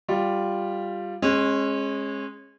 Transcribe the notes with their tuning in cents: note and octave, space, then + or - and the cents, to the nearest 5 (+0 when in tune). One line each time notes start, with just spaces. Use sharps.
G3 +0 F4 +0
G#3 +0 C#4 -30